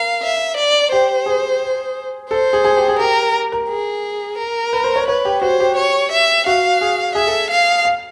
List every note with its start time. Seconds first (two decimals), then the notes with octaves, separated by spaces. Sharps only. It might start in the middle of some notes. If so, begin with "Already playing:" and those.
Already playing: A#4 F5
0.23 E5
0.57 D5
0.92 G4 C5
1.26 G#4
2.30 A4 C5
2.53 G#4
2.64 G#4
2.77 G4
2.88 G#4
2.99 G4 A#4
3.52 A#4
3.69 G#4
4.38 A#4
4.73 B4
4.84 C5
4.96 C#5
5.08 B4 C#5
5.25 G4
5.42 F#4 C5
5.60 G4
5.76 C#5
6.12 E5
6.46 F#4 F5
6.81 G#4
7.15 G#4 E5
7.27 A4
7.51 F5
7.85 F5